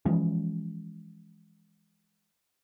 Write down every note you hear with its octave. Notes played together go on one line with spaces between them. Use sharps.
E3 F3 G#3 C#4